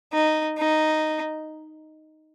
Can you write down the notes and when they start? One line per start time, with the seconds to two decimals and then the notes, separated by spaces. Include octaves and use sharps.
0.13 D#4
0.58 D#4